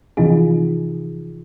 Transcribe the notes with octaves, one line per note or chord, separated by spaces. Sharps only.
C3 E3 F3 D#4 F4 G#4